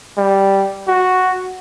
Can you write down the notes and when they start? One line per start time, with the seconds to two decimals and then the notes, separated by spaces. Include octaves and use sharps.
0.17 G3
0.87 F#4